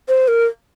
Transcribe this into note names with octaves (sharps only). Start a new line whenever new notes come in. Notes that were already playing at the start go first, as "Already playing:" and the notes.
C5
A#4